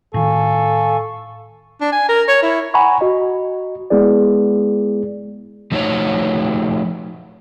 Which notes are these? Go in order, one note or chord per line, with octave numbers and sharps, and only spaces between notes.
A2 D#3 A4 F5 G#5 C#6
D4
G#5
A#4
C#5
E4
F#5 G#5 A#5 B5 C#6
F#4 D#5
G#3 B3 E4 G#4 D5
F3 A3 D#4 E4 F#4 C#5